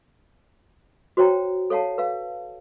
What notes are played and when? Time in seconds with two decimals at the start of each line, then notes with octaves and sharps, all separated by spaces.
1.17 F#4 C5 C#5 G5 A#5
1.70 A4 C#5 F5 F#5 A5
1.98 B4 F5